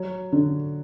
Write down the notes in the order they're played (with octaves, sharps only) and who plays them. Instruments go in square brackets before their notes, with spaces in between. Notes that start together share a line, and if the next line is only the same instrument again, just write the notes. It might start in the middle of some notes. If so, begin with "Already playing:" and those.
Already playing: [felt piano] F#3 C#5
D3